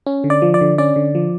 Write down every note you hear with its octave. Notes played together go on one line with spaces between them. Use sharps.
C#4
D3
D5
F3
D5
D3
C#4 D5
D3
F3